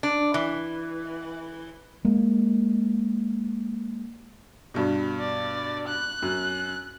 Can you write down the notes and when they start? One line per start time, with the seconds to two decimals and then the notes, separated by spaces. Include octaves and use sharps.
0.03 D4
0.34 E3
2.05 G#3 A#3
4.74 G2 B2
5.20 D5
5.88 F#6
6.22 F#2